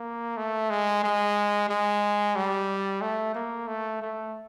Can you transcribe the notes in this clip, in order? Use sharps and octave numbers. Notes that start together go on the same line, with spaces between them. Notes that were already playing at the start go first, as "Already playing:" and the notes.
Already playing: A#3
A3
G#3
G#3
G#3
G3
A3
A#3
A3
A3